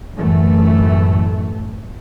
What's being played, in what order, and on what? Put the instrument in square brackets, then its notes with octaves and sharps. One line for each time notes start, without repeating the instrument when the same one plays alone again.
[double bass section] A1 F#2 E3 A3